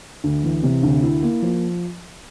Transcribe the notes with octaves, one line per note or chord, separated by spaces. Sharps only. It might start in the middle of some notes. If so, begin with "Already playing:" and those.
D2
E3
C3
D2
E4
A#3
F3